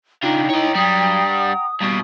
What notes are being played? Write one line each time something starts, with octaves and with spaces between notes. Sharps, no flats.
C#3 D4 D#4 F4 G5 A#5
E4 C#5 D#5
G2 F#3 G3 D#6
F#5
D#2 B2 G3 D#6